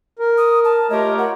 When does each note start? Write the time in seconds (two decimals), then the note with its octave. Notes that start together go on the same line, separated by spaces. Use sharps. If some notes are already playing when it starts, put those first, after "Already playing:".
0.19 A#4
0.38 D#6
0.64 A5
0.90 A3 F4 G4 A#4 C#5 D#5
1.18 F#5